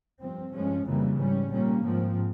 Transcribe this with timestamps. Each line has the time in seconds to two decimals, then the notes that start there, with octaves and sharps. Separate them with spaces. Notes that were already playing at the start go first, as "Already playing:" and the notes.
0.21 G2 F3 C4
0.54 G2 F3 G#3 C#4
0.86 F2 C#3 E3 G3 A#3
1.19 G#2 G3 C#4
1.51 A#2 G3 A#3 C#4
1.84 G#2 F3 C4